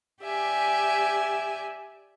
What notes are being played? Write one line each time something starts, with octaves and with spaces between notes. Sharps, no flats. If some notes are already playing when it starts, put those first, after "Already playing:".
G4 D5 E5 G#5